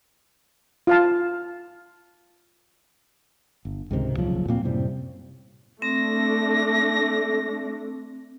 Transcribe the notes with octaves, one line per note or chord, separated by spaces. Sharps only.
F4 F5 A5
G1
C#2 G#2 C3 D#3
D#1 C#2 F3 F#3
A#2 A#3 C4
F#2 A2 C3 G3
A3 C4 D4 A#6